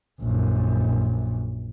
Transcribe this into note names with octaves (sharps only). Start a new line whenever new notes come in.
A#1 F#2